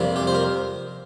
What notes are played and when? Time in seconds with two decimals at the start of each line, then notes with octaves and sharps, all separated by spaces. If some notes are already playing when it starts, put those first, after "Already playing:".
Already playing: F2 C3 G3 A#3
0.16 G4
0.27 C5
0.35 A#4